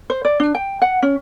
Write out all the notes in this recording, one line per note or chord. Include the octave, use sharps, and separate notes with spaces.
C5
D5
D4
G5
F#5
C#4